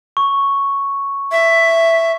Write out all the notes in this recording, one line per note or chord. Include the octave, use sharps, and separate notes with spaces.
C#6
E5